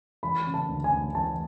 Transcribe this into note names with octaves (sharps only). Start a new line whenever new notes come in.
E3 B5
C#3
A5
D2
G#5
D2
E3 A5